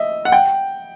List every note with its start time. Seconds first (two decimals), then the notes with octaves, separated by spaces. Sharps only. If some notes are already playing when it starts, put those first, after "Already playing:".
Already playing: D#5 E5
0.25 F#5
0.32 G5